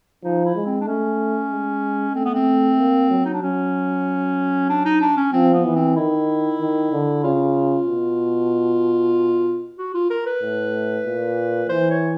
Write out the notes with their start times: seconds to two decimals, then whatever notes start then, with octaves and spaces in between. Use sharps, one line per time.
0.24 F3 D#4
0.45 E4
0.56 G#3
0.66 C4
0.81 D4
0.87 A3 C#4
1.50 G#3
2.15 A3 C4
2.25 B3
2.35 C4
2.78 A#3
3.10 F#3
3.25 D#4
3.33 D4
3.42 F#3 C#4
4.69 D4
4.85 D#4
5.01 D4
5.17 C#4
5.33 F3 C4
5.54 B3
5.65 E3
5.75 C4
5.97 D#3 E4
6.60 D#3
6.92 D3
7.24 C#3 F4
7.87 B2
9.78 F#4
9.94 F4
10.10 A#4
10.26 B4
10.42 A2
11.06 A#2
11.69 E3 C5
11.90 C#5